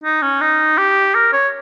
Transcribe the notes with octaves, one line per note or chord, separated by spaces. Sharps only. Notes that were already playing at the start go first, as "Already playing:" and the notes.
D#4
C#4
D#4
G4
A#4
C#5